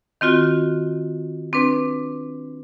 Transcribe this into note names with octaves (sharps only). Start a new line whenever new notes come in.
D#3 C4 F4 F#4
C4 D4 B4